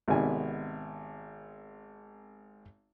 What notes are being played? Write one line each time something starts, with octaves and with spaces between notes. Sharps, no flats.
G#1 C3 D#3 B3 D5 G#5